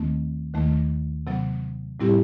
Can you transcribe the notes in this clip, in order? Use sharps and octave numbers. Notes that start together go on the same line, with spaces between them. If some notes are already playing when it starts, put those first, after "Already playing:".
Already playing: D#2 D#3 A3 C4
D#2 D#3 A3
C3 F#3 B3
A2 G3 C4 E4 G4